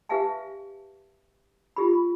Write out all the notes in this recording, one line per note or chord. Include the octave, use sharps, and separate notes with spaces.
G4 B4 E5 F5 G#5 A5
F4 G4 B5